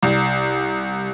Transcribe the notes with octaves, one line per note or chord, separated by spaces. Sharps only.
C2